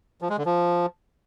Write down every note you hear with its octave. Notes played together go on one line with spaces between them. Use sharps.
F3
G#3
D3
F3